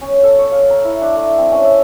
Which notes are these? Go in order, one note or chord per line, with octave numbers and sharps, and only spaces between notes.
C#4
A4
C#5
F5
A#5
E4
D4
A3
C4
C#4
E5